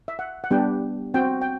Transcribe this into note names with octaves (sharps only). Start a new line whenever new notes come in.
E5
F#5
F#5
G3 B3 D4 G4 G5
C4 F#4 G5
G5